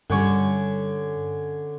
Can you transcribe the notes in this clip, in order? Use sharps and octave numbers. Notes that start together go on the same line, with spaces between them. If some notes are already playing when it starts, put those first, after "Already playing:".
G2 D3 G3 C#4 C#6